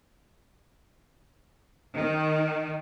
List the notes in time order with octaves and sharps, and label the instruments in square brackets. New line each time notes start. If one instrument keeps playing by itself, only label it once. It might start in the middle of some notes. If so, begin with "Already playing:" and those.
[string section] D#3